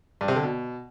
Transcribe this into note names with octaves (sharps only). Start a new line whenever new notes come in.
G2
C3
D3
B2